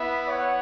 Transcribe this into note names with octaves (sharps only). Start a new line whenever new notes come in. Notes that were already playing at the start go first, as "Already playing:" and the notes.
Already playing: B3 E4 B4 E5
C#5 F#5